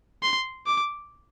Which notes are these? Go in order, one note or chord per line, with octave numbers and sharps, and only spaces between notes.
C6
D6